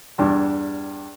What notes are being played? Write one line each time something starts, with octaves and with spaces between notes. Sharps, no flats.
E2 G2 D4